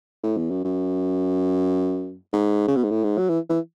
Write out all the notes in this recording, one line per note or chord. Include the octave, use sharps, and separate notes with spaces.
A2
E2
F#2
F#2
G#2
C#3
B2
G#2
A2
G#2
F#3
E3
E3